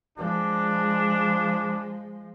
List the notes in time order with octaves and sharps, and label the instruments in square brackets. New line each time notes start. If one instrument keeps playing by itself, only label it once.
[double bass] F3 G#3 [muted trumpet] D4